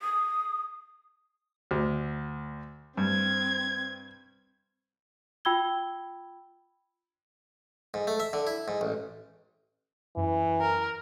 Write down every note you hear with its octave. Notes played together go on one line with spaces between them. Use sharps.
D#6
D2
G2 C4 G#6
F4 G5 B5 E6 G#6 G7
G#2
A3
E5
D3
E4
G#2
A1
F#2 E3
A#4